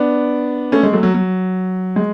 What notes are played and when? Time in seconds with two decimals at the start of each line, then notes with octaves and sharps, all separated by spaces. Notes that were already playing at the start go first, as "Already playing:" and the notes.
Already playing: B3 D4
0.72 A3 C#4
0.83 G#3
0.93 F#3 A3
1.03 F#3
1.14 F#3
1.96 G#3